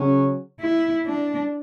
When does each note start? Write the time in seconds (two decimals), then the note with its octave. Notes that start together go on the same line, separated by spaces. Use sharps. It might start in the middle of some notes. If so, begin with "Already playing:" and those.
Already playing: C#3 F#3 C#4
0.61 E4
1.06 D4